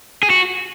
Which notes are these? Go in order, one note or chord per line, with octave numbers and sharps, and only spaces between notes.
G#4
F#4